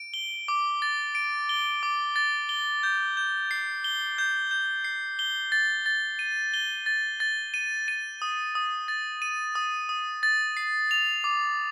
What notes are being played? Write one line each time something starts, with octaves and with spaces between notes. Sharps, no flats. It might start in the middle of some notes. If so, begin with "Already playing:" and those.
Already playing: D7
G7
D6
A6
D7
G7
D6
A6
G7
G6
G6
C7
G7
G6
G6
C7
G7
A6
A6
D#7
G7
A6
A6
D#7
D#7
D#6
D#6
A6
D#7
D#6
D#6
A6
C7
F7
D6